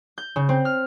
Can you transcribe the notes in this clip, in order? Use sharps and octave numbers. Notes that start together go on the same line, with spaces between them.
G6
C#3
C4
F6